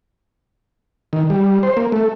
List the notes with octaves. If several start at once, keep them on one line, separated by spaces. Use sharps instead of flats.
D#3
G3
C5
A#3
A3